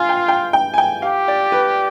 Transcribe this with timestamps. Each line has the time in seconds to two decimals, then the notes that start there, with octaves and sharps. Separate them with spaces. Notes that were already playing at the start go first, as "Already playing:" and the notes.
Already playing: F4 F5 G#5
0.09 G5
0.28 G5
0.53 G5
0.74 G#5
0.78 G5
1.02 G4 F5
1.28 D5
1.52 B4